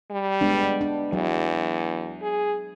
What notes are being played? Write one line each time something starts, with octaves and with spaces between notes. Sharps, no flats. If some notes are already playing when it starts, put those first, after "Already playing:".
G3
G#3 B3 D4
D4
E2 F#3
G#4